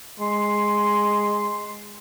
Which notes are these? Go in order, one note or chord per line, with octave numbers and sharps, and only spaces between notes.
G#3 C6